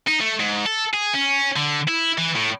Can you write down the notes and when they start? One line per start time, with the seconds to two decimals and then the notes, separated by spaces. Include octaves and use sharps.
0.07 D#4
0.21 A3
0.40 G#2
0.66 A4
0.94 G#4
1.14 C#4
1.56 D3
1.88 E4
2.18 E3
2.35 A2